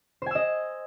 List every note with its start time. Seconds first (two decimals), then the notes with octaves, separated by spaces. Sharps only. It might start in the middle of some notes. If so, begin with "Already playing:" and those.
0.22 C5
0.26 G#5
0.31 E6
0.35 D#5